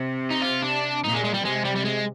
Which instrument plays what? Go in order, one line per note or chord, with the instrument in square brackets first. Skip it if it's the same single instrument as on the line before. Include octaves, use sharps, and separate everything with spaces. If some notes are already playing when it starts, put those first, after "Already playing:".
Already playing: [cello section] C3
[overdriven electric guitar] D#4
F4
D4
[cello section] A#2 [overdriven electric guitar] D#4
[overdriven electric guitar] G#3
G#3
G3
[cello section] C3 [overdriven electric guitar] G#3
[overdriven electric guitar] G3
G3
G#3